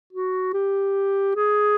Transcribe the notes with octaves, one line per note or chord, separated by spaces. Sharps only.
F#4
G4
G#4